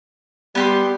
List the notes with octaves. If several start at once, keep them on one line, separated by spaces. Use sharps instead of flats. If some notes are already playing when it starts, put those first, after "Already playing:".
G3 B3 G4 C6